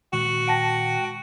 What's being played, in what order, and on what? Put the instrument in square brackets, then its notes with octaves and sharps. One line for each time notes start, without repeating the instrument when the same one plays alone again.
[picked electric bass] A#2 D#3 G#3 [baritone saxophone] F#4
[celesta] F#5 A5 A#6 [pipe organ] G5